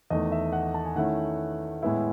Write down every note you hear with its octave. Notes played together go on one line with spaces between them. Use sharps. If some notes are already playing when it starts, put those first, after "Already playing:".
E2 D#3 A3 D#5
E5
F#5
A5
G#5
D#3 A3 C#4 E4 F#5
A2 G#3 B3 E4